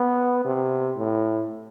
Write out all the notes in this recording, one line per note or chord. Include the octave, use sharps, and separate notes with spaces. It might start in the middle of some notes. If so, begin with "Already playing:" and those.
Already playing: B3
C3
A2